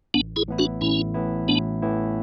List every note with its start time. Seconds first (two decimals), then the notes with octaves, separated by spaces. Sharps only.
0.14 A1 B3 D4
0.36 E4 G#4
0.48 A2 E3 B3 E4
0.59 D4 F#4
0.81 A1 C#4 E4
1.14 A2 E3 B3 E4
1.48 A1 B3 D4
1.82 A2 E3 B3 E4